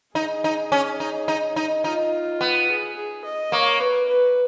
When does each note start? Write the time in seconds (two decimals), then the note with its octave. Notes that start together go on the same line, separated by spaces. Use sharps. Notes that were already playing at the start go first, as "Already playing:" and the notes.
0.15 D#4 G#4
0.44 D#4
0.72 C#4
1.00 D#4
1.28 D#4
1.56 D#4
1.84 D#4 F4
2.41 B3
2.69 G#4
2.96 G#4
3.25 D#5
3.52 A#3 C#5
3.80 B4
4.08 B4